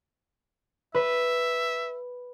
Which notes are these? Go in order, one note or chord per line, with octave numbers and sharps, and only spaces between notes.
B4 E5